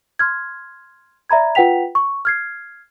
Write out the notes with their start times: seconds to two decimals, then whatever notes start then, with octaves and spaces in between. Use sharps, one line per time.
0.19 C6 F6 G#6
1.30 D5 E5 A#5 B5 G#6
1.55 F4 B4 F#5 G5 B6 F7
1.95 C#6
2.25 F6 G#6 C7